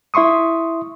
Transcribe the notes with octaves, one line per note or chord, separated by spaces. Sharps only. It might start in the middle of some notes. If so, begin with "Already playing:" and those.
E4 E5 C6 C#6 D#6